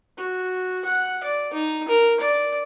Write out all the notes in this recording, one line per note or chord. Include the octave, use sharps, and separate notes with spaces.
F#4
F#5
D5
D#4
A#4
D5